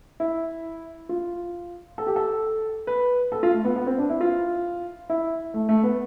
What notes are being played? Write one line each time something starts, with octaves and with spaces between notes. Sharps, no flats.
E4
F4
A4
G4
A4
B4
A4
F4
A3
B3
B3
C4
D4
E4
F4
E4
A3
A3
B3